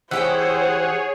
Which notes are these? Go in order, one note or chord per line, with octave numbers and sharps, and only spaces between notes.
E3 G4 G#4 C5 C#5 F#5 G5